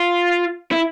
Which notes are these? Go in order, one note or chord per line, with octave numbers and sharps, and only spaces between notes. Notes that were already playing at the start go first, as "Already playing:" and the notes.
Already playing: F4
E4